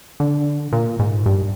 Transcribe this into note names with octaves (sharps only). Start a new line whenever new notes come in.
D3
A#2
G#2
G2